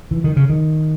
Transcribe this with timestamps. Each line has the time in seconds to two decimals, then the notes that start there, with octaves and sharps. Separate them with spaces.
0.11 E3
0.24 D#3
0.36 C#3
0.50 D#3